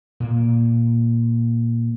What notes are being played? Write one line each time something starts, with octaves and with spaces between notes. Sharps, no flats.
A#2 A#3